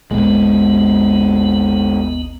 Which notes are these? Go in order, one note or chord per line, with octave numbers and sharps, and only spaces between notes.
G#1 D#2 A#2 G#3 B3